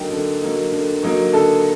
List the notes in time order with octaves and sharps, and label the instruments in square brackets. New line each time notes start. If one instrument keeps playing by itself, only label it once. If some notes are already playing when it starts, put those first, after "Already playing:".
Already playing: [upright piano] D3 F#3 A#3 D#4 G5
D3
F#3 A#3 D#4
D3
F#3 A#3 D#4
D3 A4